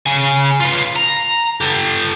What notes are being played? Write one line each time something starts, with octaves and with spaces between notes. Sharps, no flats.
C#3 G#5
B3 F4
A#5
G4 A4